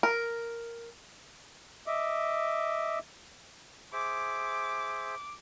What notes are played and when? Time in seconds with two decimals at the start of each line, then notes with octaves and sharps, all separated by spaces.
0.03 A#4
1.87 D#5 E5 D6
3.93 G#4 C5 E5 D6